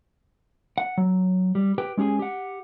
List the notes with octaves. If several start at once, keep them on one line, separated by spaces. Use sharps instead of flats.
F#5
F#3
G3
G4 B4 G5
G#3 C#4 G4 G#4 G#5
G4 F#5